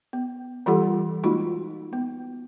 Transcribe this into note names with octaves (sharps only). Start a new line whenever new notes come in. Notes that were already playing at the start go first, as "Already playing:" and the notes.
B3
E3 G3 F4 G4 A4 F#5
G#3 A#3 D#4 F4 F#4
B3